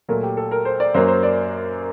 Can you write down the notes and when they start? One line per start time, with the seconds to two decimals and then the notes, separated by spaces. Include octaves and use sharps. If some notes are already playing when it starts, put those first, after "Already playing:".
0.08 A#2 F#3 A3 A#4
0.23 G4
0.37 A4
0.51 A#4
0.65 C5
0.80 D5
0.94 F#2 F#3 A#3 C5
1.08 C5
1.23 D5